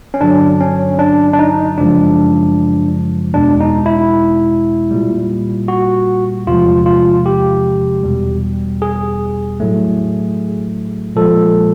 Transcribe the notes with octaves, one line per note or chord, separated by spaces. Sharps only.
C#4
G2 D3 F#3 D4
C#4
D4
D4
D#4
F#2 C#3 F3 G#3 D4
E2 B2 G#3 D4
D#4
E4
A#2 G3
F#4
E2 C3 F3 G#3 F4
F4
G4
E2 B2 G3
G#4
A2 F#3 A3
A#2 F3 G#3 A4